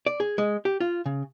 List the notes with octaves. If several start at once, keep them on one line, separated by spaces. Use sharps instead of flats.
D5
G#4
G#3
G4
F4
C#3